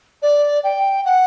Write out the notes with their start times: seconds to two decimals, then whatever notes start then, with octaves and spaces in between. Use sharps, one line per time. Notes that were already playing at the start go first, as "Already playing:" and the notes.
0.22 D5
0.63 G5
1.05 F#5